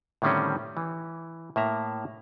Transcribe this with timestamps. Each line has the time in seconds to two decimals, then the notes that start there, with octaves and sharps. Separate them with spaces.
0.22 A2 D3 D#3 G3 C4 C#4
0.77 E3
1.56 A2 A#3 E5 A#5